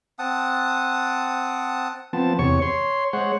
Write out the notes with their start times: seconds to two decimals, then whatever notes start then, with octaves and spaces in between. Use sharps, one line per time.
0.19 C4 F#5 A5 D#6
2.13 F3 B3 C4 A5
2.39 E2 C3 C#5 C#6
2.62 C#5 C6
3.13 G#3 C5 C#5 F#5